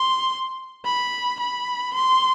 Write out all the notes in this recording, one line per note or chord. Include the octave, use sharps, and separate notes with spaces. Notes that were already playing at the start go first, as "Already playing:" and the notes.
Already playing: C6
B5
B5
C6